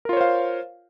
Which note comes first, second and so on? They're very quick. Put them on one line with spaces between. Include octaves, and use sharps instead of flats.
A#4 F4 C#5 C5 F5